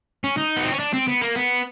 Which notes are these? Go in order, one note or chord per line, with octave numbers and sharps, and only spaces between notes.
C#4
D#4
B3
C4
C#4
D4
C4
B3
A#3
B3